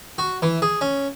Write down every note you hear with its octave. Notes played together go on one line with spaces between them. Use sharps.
F#4
E3
G#4
C#4